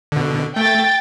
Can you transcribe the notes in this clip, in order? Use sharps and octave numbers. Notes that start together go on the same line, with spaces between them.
B2 D3
A3 G5 A6